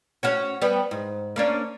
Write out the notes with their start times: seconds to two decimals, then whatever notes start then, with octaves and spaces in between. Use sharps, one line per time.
0.23 C#4 F#4 C#5
0.62 G3 B3
0.91 G#2
1.36 A#3 C#4 D4